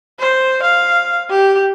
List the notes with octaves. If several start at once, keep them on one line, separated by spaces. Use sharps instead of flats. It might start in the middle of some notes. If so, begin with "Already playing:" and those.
C5
F5
G4